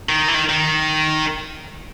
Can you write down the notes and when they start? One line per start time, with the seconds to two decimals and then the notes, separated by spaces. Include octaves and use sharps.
0.09 D#3
0.28 E3
0.34 D#3
0.49 D#3